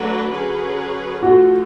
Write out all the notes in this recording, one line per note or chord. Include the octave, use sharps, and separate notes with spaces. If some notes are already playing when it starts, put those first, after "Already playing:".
Already playing: F#3 A3 D4 F#4 B4
D3 F#3 C#4 G#4 B4
D3 F3 A3 F4 F#4 A4